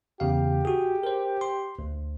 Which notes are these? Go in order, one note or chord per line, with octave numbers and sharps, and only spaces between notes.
E2 C#3 G4 F5
F#4 G#4
A#4 C5
C6
D2